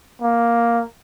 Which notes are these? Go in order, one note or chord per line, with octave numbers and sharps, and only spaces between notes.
A#3